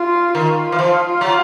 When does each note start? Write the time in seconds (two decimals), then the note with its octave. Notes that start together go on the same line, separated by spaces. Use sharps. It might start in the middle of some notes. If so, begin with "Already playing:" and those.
Already playing: F4
0.35 D#3 F4
0.72 E3
0.79 F3
1.21 F#3